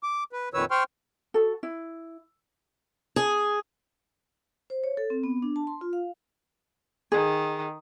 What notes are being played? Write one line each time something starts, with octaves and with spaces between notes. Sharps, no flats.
D6
B4
F2 A#2 D#3 B4 C#5 E6
C5 G5 C6 C#6 F6
F#4 A4
E4
G#4
C5
C#5
A4
C4
B3
D4
A5
C6
F4
F5
D#3 G#4